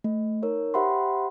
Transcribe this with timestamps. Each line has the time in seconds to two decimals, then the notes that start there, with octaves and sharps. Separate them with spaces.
0.04 A3
0.43 D#4 A#4 C#5
0.74 G4 C5 E5 F#5 B5 C6